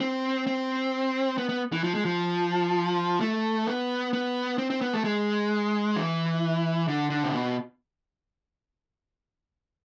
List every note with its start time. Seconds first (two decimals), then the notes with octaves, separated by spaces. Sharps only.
0.01 C4
0.47 C4
1.38 B3
1.49 B3
1.72 E3
1.84 F3
1.95 G#3
2.05 F3
3.21 A3
3.67 B3
4.13 B3
4.58 C4
4.70 C4
4.81 B3
4.93 A3
5.04 G#3
5.96 E3
6.88 D3
7.10 D3
7.24 C3
7.33 B2